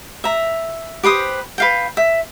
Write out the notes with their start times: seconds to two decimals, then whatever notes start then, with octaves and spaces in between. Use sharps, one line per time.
0.24 E5 A#5
1.03 G4 B4 C5 D#6
1.58 B4 F5 G5
1.97 E5